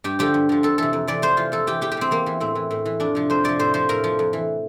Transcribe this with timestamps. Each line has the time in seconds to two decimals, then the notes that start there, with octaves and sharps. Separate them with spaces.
0.04 G2 G4
0.19 D3 F3 G4
0.34 G2
0.49 D3 F3
0.63 F2 A4
0.78 C3 E3 A4
0.93 F2
1.08 C3 E3 D5
1.22 F2 C5
1.37 E3 F4
1.52 F2 A4
1.67 E3 G4
1.81 E2 G4
1.92 G4
1.97 E3 C4
2.11 E2 A#3
2.26 E3
2.40 A2 C4
2.55 E3
2.71 A2
2.85 E3
3.00 F2 D4
3.15 C3 F3
3.30 F2 C5
3.44 C3 F3 D5
3.59 A2 C5
3.74 F3 C5
3.89 A2 A#4
4.04 F3
4.19 F2
4.33 E3